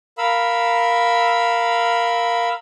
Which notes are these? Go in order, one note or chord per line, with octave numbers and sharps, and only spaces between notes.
A#4 F5 B5 E6